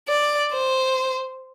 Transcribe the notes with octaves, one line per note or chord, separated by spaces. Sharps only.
D5
C5